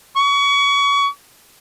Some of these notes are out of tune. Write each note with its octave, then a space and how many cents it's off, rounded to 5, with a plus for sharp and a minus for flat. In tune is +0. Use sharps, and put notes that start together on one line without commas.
C#6 +30